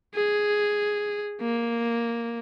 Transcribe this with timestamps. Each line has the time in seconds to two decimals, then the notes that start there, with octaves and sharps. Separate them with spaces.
0.15 G#4
1.41 A#3